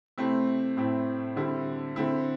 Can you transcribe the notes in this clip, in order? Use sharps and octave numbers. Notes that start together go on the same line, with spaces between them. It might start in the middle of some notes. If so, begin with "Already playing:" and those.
C3 A3 C4 E4
A2 A3 C4 E4
D3 G3 C4 E4
D3 C4 E4